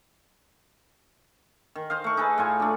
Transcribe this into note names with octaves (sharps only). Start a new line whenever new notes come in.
D#3
C5 D#5 F5
A3 C#6
D#4 G#4 A4 B4
A2 F4 G#5
A3 D4